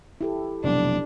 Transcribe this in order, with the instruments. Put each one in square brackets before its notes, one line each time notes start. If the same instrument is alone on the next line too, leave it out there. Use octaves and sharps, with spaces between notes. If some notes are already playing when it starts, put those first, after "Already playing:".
[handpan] E4 G4 A4
[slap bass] F1 B1 [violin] D4